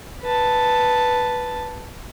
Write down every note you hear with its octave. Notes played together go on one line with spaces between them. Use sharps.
B4 A5